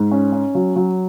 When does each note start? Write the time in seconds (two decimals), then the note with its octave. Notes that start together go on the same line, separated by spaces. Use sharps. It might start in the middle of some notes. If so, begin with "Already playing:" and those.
Already playing: G#2
0.11 C#4
0.33 C#4
0.55 F#3
0.76 F#3